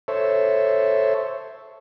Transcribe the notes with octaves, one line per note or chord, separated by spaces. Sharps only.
A4 C5 C#5 E5